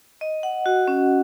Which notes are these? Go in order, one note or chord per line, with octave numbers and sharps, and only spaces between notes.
D#5
F#5
F#4
C#4